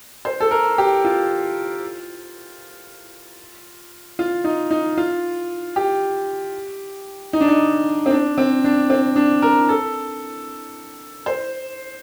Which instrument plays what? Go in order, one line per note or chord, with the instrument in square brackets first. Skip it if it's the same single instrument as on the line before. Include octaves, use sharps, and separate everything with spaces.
[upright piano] C5
A4
A#4
G4
F4
F4
D#4
D#4
F4
G4
D#4
D4
D#4
C4
D4
C4
D4
C4
D4
A#4
A4
C5